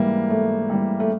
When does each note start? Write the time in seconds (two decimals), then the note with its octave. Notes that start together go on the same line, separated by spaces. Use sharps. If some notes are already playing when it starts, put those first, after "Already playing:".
Already playing: G#2 E3 G3 A#3
0.30 G#2 A3
0.70 E3 G3
1.00 A3